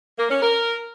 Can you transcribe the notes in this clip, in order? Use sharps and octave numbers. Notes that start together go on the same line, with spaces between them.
A#3
C#4
A#4